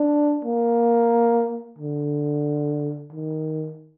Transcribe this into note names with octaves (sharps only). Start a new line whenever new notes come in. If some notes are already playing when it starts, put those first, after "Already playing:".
Already playing: D4
A#3
D3
D#3